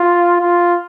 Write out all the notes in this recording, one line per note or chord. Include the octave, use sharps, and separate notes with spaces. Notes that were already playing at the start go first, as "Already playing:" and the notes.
Already playing: F4
F4